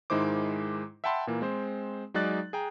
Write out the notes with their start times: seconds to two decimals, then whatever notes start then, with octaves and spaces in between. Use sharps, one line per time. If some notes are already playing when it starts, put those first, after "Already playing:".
0.10 G#2 D#3 G#3 E4 C5 D6
1.04 E5 F#5 G5 A5 B5 C6
1.27 A#2 E3 A#3
1.41 G#3 C4 C5
2.14 F#3 G#3 D#4 D5 F#6 A6
2.53 G#4 G5 A#5